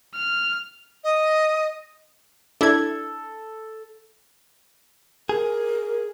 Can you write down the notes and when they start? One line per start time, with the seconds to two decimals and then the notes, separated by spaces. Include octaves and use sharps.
0.14 F6
1.04 D#5
2.61 D4 E4 A4 G#6
5.29 G#4 A#4